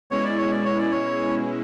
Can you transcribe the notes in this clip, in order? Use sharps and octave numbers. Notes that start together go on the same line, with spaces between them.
B2 G#3 C#4 E4 C#5
D5
C#5
D5
C#5
D5
C#5